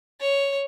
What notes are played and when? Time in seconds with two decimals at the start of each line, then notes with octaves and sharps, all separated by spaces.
0.21 C#5